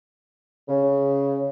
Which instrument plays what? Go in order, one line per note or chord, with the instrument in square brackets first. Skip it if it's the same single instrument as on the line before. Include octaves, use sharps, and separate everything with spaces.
[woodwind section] C#3